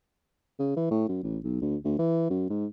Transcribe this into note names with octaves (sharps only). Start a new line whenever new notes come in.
C#3
E3
A2
F#2
A1
B1
D2
D2
E3
F#2
G#2